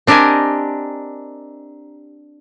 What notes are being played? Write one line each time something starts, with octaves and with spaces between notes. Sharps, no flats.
C4 D4 G4 A#4 D#5 G#5